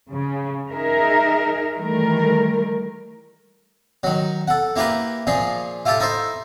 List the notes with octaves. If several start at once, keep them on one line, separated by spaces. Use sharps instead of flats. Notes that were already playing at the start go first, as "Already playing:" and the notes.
C#3
D#4 G#4 A#4 E5
D#3 E3 G3 A3 A#4
D#3 F#3
A4 F#5
A#3 E4 G4 A#4 B4
A#2 F3 G#4
E4 F4 G4 A4 A5
D#4 E4 A4 C5